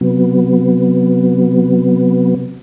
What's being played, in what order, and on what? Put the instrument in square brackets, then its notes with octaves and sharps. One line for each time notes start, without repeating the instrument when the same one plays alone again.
[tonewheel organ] C3 F#3 B3